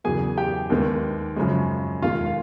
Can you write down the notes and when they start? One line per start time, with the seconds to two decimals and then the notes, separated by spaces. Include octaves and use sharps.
0.04 E2 C#3 F#3 A#3 G#4 G#5
0.37 G4 G5
0.70 D#2 D#3 G#3 B3
1.36 F#2 C#3 F3 G#3
2.02 E1 D#2 D#3 G#3 F4 F5
2.26 F5